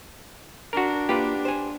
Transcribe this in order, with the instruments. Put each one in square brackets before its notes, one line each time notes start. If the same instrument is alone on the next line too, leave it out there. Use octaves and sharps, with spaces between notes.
[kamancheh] D4 [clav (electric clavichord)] F#4 A#4
[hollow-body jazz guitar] A#3 F4 [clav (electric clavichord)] G4 B4
[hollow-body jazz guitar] C5 G#5